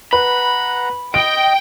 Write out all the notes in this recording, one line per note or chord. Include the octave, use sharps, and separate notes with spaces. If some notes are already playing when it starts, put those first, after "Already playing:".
B4 F#5 A#5 B5
D#5 G5 D7